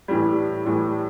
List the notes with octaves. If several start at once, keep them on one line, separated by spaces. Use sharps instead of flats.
A2 E3 G3
A2 E3 G3